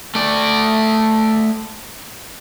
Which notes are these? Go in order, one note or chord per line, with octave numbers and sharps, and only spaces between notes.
A3 D5